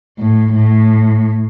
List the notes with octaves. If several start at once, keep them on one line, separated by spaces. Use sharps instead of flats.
A2
A2